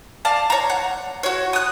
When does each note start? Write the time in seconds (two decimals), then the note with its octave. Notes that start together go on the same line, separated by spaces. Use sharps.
0.25 D5 F5 A5
0.50 C#5 A#5
0.70 F#5
1.23 F#4 C#5
1.53 D#6 F#6